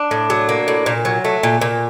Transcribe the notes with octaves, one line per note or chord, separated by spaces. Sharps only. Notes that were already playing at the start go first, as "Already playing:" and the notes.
Already playing: D4
A2
F#3
A#3
A2
A#2
F#3
A3
A#2
A#2